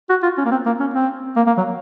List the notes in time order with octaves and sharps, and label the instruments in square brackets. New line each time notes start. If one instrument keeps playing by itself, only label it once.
[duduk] F#4
F4
C#4
A#3
C4
A#3
C#4
C4
A#3
A#3
F#3